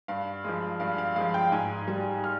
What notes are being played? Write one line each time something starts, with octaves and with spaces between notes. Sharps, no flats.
G2 F5
F3 G#3
G2 F5
F5
F3 G#3 F5
G5
G#2 G#5
G3
F6